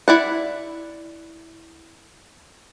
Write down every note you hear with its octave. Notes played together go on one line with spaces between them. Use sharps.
E4 D5 F#5